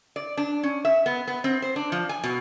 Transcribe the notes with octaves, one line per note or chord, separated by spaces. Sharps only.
D5
D4
C#4
E5
B3
B3
C4
C5
D4
F3
G#5
B2